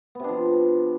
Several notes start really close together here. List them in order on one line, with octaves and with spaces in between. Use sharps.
B3 C3 D4 F3